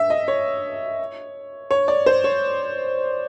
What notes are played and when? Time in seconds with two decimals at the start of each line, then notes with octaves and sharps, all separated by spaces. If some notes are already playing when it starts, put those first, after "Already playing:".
Already playing: E5
0.10 D#5
0.28 C#5
1.71 C#5
1.88 D5
2.06 C5
2.24 C#5